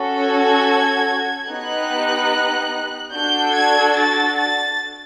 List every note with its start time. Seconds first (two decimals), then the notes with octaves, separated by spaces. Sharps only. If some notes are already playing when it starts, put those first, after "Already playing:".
Already playing: C#4 F#4 A4
0.23 G#6
1.47 B3 D#4 G4 F#6
3.13 D4 F#4 A4 G6
3.54 G#6
3.96 A6
4.37 A6